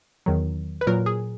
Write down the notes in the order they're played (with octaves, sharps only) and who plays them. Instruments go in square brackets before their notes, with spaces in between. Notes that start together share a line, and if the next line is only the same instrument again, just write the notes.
[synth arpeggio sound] E2 D#3 F#3
B4
A#2 F#3 A#4
G#4